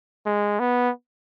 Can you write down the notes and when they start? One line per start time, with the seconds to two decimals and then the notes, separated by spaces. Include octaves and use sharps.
0.26 G#3
0.60 B3